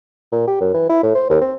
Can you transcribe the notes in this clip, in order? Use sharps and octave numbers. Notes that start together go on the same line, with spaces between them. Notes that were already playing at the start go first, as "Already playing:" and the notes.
A#2
G4
F#2
E3
E4
A2
C5
D#2
C4